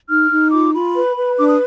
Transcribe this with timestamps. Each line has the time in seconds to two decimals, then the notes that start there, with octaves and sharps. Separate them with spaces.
0.09 D#4 F6
0.31 D#4
0.52 F4 D6
0.73 F4 B5
0.95 B4
1.16 B4
1.38 D4 D6
1.48 D#6